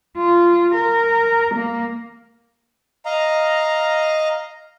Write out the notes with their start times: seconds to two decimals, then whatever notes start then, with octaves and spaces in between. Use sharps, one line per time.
0.18 F4
0.75 A#4
1.55 A#3
3.06 D#5 F5 A#5